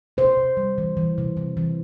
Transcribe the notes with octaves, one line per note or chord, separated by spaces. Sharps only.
C3 C5
C3
G3
E3
E3
C3
E3
E3